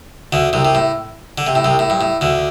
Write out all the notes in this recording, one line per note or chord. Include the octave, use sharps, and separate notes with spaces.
D2 D3
C2 C3
C3
A2
D3
C3
A2
C2 C3
A2
G2
A2
D2 D3